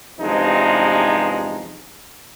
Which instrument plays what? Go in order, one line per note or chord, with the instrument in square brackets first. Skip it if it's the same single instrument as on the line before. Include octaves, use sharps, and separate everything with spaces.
[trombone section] E2 G2 C3 F3 G#3 D#4